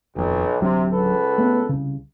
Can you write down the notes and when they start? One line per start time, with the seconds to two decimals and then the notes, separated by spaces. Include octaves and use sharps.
0.16 D#1 B1 F2
0.60 D1 C3 F#3 D4
0.92 C#2 A4 B4
1.38 A3 B3
1.69 C2 C#3